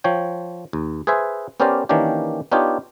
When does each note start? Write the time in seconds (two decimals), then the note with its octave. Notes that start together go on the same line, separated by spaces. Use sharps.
0.04 F3 C#5 G5
0.73 D#2
1.07 G#4 B4 C5 E5 G#5
1.60 B3 C#4 G4 A#4 C5 D5
1.89 D#3 E3 A#3 C#4 D4 G4
2.52 B3 D4 D#4 F4 G4 C#5